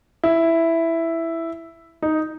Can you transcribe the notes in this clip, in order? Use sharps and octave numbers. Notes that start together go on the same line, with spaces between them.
E4
D#4